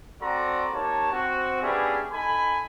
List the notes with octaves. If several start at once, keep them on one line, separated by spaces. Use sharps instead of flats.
C4 F#4 A4 D5 A#5 C6
A#3 D#4 G4 C#5 A5
C4 F#4
B3 C#4 D4 E4 G4 G#4
D#4 A4 G#5 B5